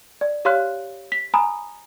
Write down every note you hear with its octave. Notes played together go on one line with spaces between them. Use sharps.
D5
G4 C#5 F5 C6 F6 F#6
B6
G#5 A#5 B5 D#6